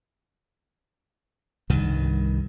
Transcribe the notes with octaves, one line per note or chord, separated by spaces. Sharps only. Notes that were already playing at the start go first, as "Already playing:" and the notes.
C2 G2 D#3